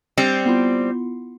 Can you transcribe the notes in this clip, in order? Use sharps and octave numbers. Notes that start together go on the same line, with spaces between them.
G3 C4 C7 C#7
B3 E4 F4